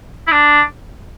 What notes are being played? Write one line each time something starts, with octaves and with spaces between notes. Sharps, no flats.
E4
D4